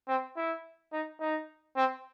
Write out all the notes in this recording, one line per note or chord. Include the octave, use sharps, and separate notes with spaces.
C4
E4
D#4
D#4
C4